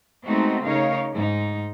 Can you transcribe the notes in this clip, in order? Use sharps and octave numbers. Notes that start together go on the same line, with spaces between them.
G#3 A3 B3 C4 D#4 F#4
C#3 D#4 A#4 C#5 F5
G#2 D#4